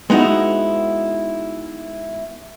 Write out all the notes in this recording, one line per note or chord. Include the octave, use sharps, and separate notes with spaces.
G#3 B3 D#4 E4 F#4